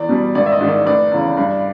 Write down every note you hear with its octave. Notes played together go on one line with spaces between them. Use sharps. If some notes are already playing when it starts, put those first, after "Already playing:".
Already playing: E2 D5
B2 G3
G#1 D5
E5
D#5
G#2 D#3
D5
F1 D5
E2 C#3
G2